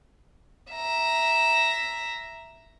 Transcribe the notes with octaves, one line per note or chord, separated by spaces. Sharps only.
E5 A#5